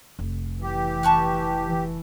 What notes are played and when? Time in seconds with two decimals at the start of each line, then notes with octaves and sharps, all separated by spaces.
0.19 F1
0.62 E3 G4
1.03 A5 C#6 F#6